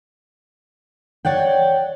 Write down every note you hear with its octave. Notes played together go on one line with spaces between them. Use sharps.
C#5 D5 F#5 G5